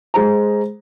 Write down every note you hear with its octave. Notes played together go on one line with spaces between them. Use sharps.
G#3 G#4 C5 A#5